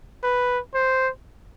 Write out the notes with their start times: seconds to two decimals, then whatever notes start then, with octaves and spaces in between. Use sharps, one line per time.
0.24 B4
0.74 C5